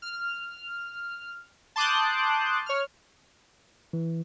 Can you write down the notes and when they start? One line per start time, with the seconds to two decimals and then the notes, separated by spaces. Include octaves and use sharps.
0.02 F6
1.76 A5 C6 D6 D#6 F#6 G6
2.66 C#5 F6
3.93 E3